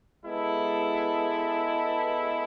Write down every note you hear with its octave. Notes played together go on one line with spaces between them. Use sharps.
G#3 B3 E4 A4